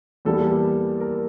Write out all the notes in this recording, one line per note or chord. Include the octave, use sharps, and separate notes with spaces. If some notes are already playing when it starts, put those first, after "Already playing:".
E2 E3 G3 A#3 A4
G4
A4
A#4